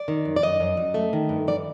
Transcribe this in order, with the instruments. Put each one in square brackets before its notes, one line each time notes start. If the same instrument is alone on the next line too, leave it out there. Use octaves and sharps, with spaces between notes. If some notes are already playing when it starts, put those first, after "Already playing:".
Already playing: [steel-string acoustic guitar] D5
D#3
F#2
D5
F#2 D#5
F#2
F#2
A3
D#3
G2
G2 D5